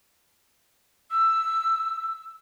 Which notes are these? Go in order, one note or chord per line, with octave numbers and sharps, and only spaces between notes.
E6